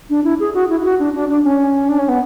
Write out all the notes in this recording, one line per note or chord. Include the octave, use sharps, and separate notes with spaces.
D4
E4
G#4
F#4
E4
E4
F#4
D4
D4
D4
C#4
D4
C#4
B3